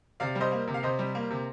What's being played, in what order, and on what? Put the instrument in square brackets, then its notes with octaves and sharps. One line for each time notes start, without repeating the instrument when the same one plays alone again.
[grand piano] C3 D5 F5
G3
C5 D#5
A#3
C3
F5
C3 C5 D#5
G3
A#3
C3